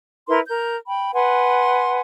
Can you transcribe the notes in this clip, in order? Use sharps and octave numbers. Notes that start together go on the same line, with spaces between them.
E4 A#4 B4 C6
A#4 G6
G5 B5
B4 F#5 G#5 C6